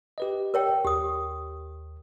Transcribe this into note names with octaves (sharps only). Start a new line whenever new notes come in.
G4 B4 D#5
A#4 C#5 G5
D#2 G4 D#6